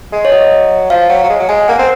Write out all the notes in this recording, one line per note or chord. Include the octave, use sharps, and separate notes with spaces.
G#3
C#5
F#3 D#5
F3 F5
F#3
F#3
G#3
F#3
G#3 G#5
A#3 F#5
C4